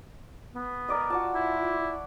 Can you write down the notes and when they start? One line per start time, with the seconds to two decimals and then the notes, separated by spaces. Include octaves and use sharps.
0.55 B3
0.88 A#4 D5 D#5
1.10 F4 F#4 D5 A5
1.34 E4